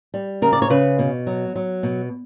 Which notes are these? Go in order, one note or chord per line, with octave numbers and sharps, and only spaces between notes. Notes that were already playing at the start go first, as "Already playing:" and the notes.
G3
C#3 A#4
D5
C#5
C#3 B4
B2
F#3
F#3
B2